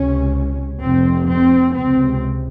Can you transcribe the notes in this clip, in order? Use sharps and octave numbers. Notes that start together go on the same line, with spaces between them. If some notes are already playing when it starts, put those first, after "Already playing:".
Already playing: C#2 C3 C#4
F1 F2 C3 C4
C4
C#2 C3 C4